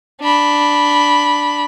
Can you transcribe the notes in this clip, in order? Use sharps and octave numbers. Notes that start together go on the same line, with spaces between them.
D4 B5